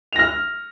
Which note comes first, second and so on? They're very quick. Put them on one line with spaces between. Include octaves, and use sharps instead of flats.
F7 A#6 F6